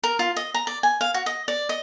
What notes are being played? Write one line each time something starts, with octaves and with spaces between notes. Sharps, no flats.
A#4
F4
D#5
A#5
D5
G#5
F5
F#4
D#5
D5
D#5